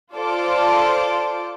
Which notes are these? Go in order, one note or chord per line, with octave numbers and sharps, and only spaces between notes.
F4 A4 C5 D5 D6